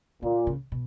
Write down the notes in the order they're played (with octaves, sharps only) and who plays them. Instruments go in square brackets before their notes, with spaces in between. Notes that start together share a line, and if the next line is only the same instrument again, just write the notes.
[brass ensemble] A#2 [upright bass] D3
[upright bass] C#3
B2